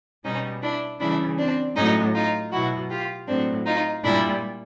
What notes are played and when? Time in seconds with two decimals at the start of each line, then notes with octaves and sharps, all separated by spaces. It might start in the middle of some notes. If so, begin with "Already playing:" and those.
0.24 B2 G3 C#4 D#4
0.62 D4 E4
1.00 C#3 E3 G3 D4 E4
1.38 C4 D4
1.76 A2 F#3 C#4 D#4
2.14 D#4 F4
2.51 B2 F#3 E4 F#4
2.90 F4 G4
3.27 A2 F#3 C4 D4
3.66 D#4 F4
4.03 A#2 G3 D4 E4